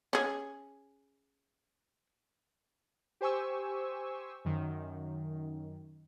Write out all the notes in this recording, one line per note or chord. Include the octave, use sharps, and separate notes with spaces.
C#4 G#4
G4 C5 G#5 C#6 E6
F#2 D#3